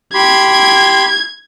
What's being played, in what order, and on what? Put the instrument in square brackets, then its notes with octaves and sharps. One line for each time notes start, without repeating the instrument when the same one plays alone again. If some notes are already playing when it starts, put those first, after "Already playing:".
[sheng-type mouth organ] G4 B5 C6 [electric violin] G#6